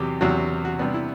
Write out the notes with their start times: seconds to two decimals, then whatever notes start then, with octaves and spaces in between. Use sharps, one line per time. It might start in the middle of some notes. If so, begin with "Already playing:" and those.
Already playing: E2 C3 F#3 G4
0.21 E2 C3 F#3 F#4
0.65 F#4
0.79 C3 G3 B3 D4
0.94 E4